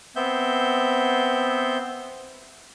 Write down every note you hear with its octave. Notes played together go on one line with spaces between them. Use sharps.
B3 C4 E5 G6